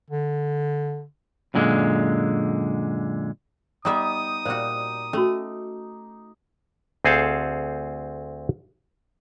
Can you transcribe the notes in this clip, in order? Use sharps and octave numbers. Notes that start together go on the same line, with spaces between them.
D3
F#2 A#2 D3 G#3
G3 B3 D#4 E5 D6 D#6
A#2 G3 F#4 C5
A3 C#4 F#4
D2 C4 G#4 A4 C5 F5